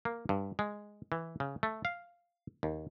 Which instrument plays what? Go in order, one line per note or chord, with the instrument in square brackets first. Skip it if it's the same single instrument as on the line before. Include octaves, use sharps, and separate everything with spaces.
[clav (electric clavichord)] A#3
G2
G#3
E3
C#3
A3
F5
D#2